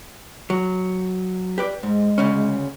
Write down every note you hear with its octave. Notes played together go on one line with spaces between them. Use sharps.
F#3
G4 B4 D5
G#2 G#3
D2 C#3 C#4